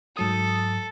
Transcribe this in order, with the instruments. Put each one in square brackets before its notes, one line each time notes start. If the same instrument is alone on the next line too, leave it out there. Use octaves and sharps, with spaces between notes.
[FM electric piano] G#2 F#3 D#6 [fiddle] A4